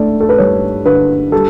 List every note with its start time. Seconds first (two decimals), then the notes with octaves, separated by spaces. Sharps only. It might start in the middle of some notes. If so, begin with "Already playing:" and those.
Already playing: D3 A3 D5
0.20 A4
0.29 B4
0.38 G2 C#5
0.85 D3 B4
1.32 G3 A4